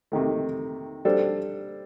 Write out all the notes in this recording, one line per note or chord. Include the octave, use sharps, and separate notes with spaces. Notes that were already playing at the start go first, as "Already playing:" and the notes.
C3 D#3 A3
G3 D4 A4 C5